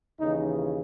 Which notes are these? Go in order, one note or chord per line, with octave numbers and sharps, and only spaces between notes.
D#2 C#3 E3 D#4